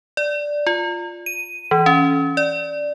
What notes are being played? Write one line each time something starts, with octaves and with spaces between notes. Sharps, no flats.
D5
F4
D#7
E3
C#4
D5